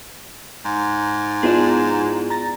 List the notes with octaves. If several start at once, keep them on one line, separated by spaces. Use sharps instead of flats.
G#2
B3 D4 E4 F4 G#4
A#5 A6 A#6